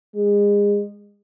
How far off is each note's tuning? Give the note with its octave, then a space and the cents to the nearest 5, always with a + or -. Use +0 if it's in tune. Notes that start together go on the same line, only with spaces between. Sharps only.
G#3 -30